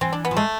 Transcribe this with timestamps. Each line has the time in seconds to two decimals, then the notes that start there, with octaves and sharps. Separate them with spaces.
0.01 E3 C4
0.13 D4
0.25 B3
0.31 F3
0.37 G#3 A3